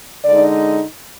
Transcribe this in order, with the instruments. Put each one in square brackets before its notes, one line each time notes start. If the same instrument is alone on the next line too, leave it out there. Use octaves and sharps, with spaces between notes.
[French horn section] D3 G#3 D#4 D5